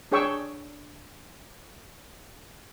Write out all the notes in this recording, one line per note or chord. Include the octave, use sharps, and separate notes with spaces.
D4 G#4 C#5 G5 C#6 E6